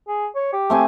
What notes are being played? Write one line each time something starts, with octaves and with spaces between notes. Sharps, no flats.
G#4
C#5
G4
A3 C4 G#5